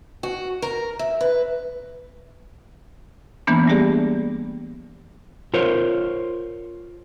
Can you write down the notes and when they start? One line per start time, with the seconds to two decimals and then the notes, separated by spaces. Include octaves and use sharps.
0.23 F#4
0.62 A#4
0.99 E5
1.21 B4
3.47 E3 G#3 A#3 B3 D4
3.67 G3 A3 B3 G4 G#4 D5
5.54 F4 A#4 C5 C#5